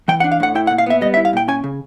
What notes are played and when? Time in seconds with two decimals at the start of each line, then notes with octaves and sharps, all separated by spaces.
0.08 E3 G5
0.20 F#5
0.24 D4
0.32 F5
0.40 A2 F#5
0.55 E4 G5
0.67 F#5
0.71 A#2
0.78 F5
0.86 B3 E5
1.01 G3 D#5
1.14 E5
1.17 E4
1.25 F5
1.33 A#2 G5
1.48 C#4 G#5
1.64 C#3